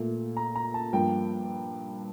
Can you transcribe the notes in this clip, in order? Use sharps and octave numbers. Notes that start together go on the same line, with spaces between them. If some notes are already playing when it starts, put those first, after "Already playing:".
Already playing: A#2 A3
A#5
A#5
A5
G2 F3 A#3 G5